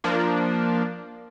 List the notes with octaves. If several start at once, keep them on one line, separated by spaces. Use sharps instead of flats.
F3 A#3 D4